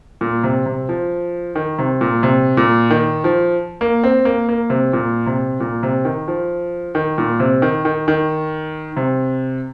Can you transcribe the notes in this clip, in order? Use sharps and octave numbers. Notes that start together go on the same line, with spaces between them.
A#2
C3
C3
F3
D#3
C3
A#2
C3
A#2
D#3
F3
A#3
C4
A#3
A#3
C3
A#2
C3
A#2
C3
D#3
F3
D#3
A#2
C3
D#3
D#3
D#3
C3